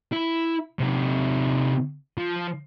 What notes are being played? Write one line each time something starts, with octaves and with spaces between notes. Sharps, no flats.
E4
C3 D#4
F3